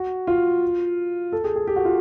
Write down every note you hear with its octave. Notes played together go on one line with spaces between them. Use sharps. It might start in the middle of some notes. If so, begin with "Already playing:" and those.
Already playing: F#4
F4
A4
G#4
G#4
G4
F#4
F4